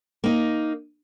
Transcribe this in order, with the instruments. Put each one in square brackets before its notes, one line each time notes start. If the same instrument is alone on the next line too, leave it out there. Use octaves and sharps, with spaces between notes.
[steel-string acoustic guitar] A#3 D#4